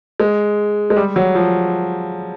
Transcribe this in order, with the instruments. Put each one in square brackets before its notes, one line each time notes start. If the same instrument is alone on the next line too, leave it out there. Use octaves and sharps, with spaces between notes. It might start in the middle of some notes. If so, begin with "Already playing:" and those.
[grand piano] G#3
G#3
G3
F#3
F3